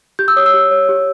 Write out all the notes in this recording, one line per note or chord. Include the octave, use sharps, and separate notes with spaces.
G4 G6
E6
C#5 D#6
E6
G4
C#5
G4